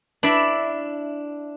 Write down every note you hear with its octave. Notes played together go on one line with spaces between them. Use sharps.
D4 E4 D5 E5